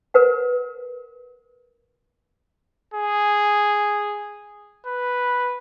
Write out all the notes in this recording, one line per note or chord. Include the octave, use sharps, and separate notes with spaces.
A#4 B4 F#5
G#4
B4